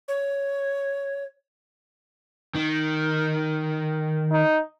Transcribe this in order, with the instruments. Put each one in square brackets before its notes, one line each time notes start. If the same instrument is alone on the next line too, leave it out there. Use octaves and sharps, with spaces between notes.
[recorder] C#5
[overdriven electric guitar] D#3
[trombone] D#4